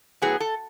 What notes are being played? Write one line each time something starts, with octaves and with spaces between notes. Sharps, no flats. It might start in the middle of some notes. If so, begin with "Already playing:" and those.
A2 F#3 B3 G#4
A4